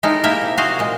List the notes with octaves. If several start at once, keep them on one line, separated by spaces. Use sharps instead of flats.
G#3 D#4 E4 G4 A4 A#4
A#3 E4 G4 A#4 E5 G5
C3
F#4 G#4 C5 D#5 F5
A#2 G#3